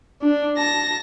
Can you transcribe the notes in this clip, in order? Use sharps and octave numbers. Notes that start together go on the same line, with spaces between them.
D4
A5 A#6